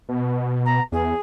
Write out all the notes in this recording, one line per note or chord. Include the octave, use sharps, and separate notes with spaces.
B2
A#5
E2 G#4